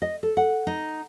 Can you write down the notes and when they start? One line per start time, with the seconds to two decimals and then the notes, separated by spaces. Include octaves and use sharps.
0.02 D#5
0.23 A4
0.37 F#5
0.67 D#4